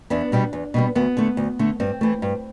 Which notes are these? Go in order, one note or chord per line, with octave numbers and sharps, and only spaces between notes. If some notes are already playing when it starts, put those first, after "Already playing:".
E2 B3 D4
B2 G3 B3
E2
B2 G3 B3
D2 B3
D3 A3
D2
D3 A3
G2 C4
E3 A3
G2